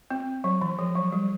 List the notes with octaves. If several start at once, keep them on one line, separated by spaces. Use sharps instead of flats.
C4
F#3
E3
F3
F#3
G3